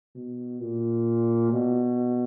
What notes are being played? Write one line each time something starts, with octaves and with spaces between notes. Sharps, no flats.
B2
A#2
B2